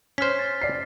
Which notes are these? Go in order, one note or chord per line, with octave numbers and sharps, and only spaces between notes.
C#4 C5 F6 B6
A6
D5 C7